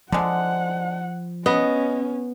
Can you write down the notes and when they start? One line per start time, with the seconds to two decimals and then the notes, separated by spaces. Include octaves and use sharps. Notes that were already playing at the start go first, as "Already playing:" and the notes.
0.12 D3 F3 G#3 F#5
1.46 B3 C#4 D#5